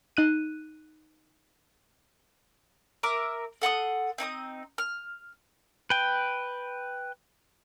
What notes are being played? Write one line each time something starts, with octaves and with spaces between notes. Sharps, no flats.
D#4 F#6 D#7
A#4 E5 D6
A4 F#5 C6 D#6
C4 D#4 G#5 D#6
F6
B4 G5